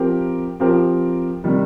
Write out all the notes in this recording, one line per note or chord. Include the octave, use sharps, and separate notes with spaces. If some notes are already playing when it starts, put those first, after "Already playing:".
Already playing: F3 C4 G4 A#4
F3 C4 G4 A#4
C3 D#3 G3